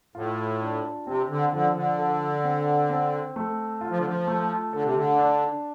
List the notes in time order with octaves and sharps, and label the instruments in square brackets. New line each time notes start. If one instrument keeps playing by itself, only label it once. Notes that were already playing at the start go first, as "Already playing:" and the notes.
[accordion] A2 [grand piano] F4
[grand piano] D4
[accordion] C3 [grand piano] C4
[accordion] D3
[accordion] D3 [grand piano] F3
[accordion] D3
[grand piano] A4
C4
C4
A3
F4
[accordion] F3
D3
F3
[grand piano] A3
[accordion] D3 [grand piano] A4
[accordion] C3
D3
[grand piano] D4